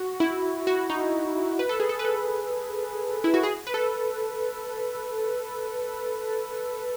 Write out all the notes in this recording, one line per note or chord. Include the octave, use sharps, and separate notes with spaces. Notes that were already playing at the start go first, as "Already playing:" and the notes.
Already playing: F#4
E4
F#4
D#4
B4
A4
G#4
A4
B4
A4
E4
F#4
G#4
B4
A4